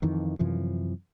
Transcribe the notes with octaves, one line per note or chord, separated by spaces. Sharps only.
F2 D#3 E3
F#2 C3 E3 F3